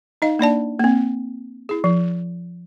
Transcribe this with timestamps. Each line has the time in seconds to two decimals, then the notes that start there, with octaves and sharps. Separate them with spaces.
0.22 D#4 D#5 F5
0.39 A#3 D4 D5 A5
0.80 A#3 C4
1.69 E4 G#4
1.84 F3